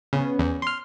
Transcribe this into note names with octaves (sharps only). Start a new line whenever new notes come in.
C#3 B3 C#4
E2
C6 F6